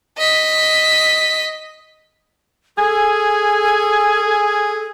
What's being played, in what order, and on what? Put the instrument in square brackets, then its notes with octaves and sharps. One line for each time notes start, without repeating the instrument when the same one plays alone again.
[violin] D#5 B6
[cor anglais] G#4 [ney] A4 [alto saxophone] G#5